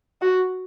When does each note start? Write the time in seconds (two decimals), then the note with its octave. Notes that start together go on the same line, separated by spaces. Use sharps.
0.21 F#4